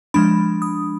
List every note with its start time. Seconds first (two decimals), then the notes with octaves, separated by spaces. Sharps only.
0.14 F3 G#3 D4 B5
0.62 D#6